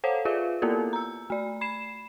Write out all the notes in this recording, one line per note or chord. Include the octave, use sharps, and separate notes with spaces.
A4 C5 C#5 F5 F#5
F4 G#4 B4 E5 F5
A#3 B3 E4 F4 A4 A#4
A#5 E6
A3 D5
B5 C7 E7